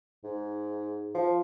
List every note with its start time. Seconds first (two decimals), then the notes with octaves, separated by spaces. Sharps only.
0.24 G#2
1.15 F3